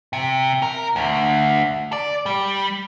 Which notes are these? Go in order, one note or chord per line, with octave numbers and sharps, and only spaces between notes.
C3
A#4
D2
D5
G3